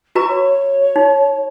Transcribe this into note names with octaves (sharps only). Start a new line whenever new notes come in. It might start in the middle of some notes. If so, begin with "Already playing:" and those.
F#4 B4 A#5 C#6
C#5
D#4